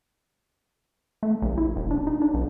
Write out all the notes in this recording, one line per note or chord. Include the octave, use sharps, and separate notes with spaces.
A3
A#1
E4
D#1
D4
D#4
D4
B1